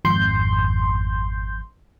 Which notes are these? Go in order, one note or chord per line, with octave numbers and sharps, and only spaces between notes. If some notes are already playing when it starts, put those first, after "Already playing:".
G#1 F2 C6 G6